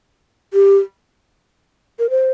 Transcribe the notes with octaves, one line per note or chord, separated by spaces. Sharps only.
G4
A#4
C5